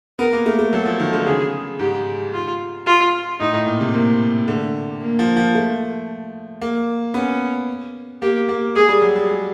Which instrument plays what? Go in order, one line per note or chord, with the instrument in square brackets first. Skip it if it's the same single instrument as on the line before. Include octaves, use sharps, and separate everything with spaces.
[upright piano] B3 [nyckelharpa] A#4
[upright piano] A#3
A3
A3
[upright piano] F#3 [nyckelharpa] A4
[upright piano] F3
D#3
D3
[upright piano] C#3 [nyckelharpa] G#4
[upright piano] G#2 [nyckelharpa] G4
[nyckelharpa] F4
F4
[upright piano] A2 [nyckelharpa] D#4
[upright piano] A2
A#2
C3
[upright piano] C3 [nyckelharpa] A#3
[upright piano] D3 [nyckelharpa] A3
[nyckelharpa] A#3
[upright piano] F3
F3
A3
A#3
[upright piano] B3 [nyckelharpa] C#4
[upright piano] A#3 [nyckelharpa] G4
[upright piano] A#3
[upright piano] G#3 [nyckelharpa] G#4
[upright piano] G3
F#3
G3
G#3